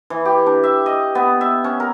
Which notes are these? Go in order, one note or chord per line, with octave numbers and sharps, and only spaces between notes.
E3
G4
D4
E5
D#5
B3
E5
C#4
A#4